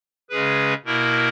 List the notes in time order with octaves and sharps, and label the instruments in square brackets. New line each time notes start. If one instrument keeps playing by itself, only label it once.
[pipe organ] C#3 G#3 C#4 G#4 B4
B2 A#3 E4 A#4